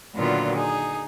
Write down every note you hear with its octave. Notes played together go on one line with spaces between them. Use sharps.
A#2 D3 D#3 F#3 B3 F4
D#4 G#4